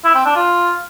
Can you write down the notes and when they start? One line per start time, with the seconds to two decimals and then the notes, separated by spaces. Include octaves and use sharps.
0.04 E4
0.14 C4
0.25 D4
0.35 F4